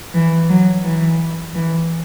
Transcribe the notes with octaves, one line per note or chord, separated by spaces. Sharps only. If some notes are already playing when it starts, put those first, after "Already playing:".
E3
F#3
E3
E3